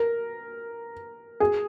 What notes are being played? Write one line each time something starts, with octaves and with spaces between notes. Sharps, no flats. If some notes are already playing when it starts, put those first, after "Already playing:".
Already playing: A#4
G#4